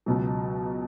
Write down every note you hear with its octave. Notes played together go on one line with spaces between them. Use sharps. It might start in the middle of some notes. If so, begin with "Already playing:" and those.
C#2 B2 F#3